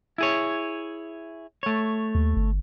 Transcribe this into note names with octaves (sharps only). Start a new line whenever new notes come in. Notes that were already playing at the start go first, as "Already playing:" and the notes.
E4 G#4 C#5
A3 C#5
D#2
G1